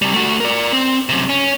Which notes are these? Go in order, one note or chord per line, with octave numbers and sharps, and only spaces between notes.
C3 G3
A3 F#4
A#4 D5
C4
F#2 C3
C#4